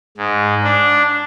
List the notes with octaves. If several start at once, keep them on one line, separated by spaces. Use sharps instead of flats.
G#2
D4